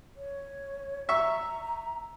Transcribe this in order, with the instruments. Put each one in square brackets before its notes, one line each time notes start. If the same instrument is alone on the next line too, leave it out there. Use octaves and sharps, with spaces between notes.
[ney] C#5
[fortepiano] E5 C#6 [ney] A#5